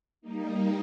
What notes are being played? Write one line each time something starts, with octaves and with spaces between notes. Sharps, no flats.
G3 A#3 D#4